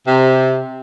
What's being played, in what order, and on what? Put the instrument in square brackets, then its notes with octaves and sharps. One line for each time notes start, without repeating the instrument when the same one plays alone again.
[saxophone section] C3